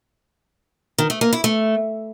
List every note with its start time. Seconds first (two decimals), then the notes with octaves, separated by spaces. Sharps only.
0.98 D#3
1.10 A3
1.21 A#3
1.33 E4
1.44 A3